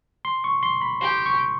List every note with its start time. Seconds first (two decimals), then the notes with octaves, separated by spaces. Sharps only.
0.25 C6
0.44 C#6
0.63 C6
0.81 B5
1.01 G4 C6
1.26 C#6